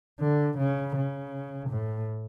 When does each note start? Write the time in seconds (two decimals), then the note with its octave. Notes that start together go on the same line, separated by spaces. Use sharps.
0.20 D3
0.58 C#3
0.95 C#3
1.69 A2